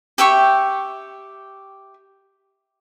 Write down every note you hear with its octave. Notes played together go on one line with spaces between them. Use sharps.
G4 E5 G5 C#6